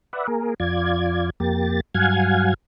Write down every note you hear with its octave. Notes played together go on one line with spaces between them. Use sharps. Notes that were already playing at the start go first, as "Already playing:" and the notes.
B4 D5 E5 F#5
A#3 G#4 A#4
F2 F4 D5 G#6
F2 A#3 G4 A6
G2 F#3 F5 F#5 G#5 G#6